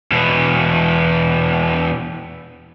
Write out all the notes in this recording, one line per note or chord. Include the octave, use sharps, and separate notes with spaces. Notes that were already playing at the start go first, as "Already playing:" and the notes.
E2 B2